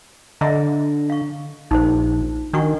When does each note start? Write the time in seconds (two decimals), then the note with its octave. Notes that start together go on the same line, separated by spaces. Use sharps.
0.41 D3 D#5 E5 A#5
1.10 F5 C#6
1.71 A#1 D#4 C5
2.53 D#3 D4 F#4 C#6